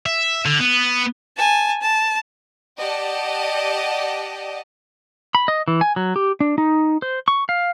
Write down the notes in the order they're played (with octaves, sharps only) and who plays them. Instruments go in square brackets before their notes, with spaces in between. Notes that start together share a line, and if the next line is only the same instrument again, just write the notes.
[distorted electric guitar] E5
D3
B3
[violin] G#5 A5
A5
[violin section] G4 D5 D#5 F#5 A5
[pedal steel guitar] B5
D#5
E3
G#5
F#3
G4
D4
D#4
C5
C#6
F5